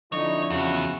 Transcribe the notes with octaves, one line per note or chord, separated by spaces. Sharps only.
D3 F3 C4 D#4 E4 C#5
E2 C#3 F#4